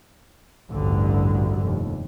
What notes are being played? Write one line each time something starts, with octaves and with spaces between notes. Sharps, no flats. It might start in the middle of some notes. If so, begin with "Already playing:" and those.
A1 D2 G2 A#2 D3
F1 D#2